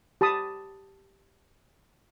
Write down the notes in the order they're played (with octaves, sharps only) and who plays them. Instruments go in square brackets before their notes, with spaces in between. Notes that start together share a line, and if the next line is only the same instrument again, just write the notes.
[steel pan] G4 A5 B5 D#6